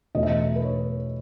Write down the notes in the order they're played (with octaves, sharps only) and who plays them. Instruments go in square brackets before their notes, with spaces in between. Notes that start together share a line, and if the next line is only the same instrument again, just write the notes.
[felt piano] E2 B2 A3 D#5
E5
D#5
B4
C#5